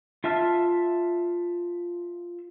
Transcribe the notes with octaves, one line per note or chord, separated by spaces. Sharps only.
F4 E5 A5 F6